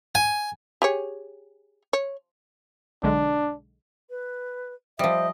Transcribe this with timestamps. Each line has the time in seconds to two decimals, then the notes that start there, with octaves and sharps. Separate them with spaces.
0.15 G#5
0.82 G4 G#4 C#5
1.93 C#5
3.03 B1 D3 G#3 D4
4.10 B4
4.99 F3 G3 C5 D#5 E5